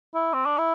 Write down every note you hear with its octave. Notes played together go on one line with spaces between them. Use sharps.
E4
C4
D4
E4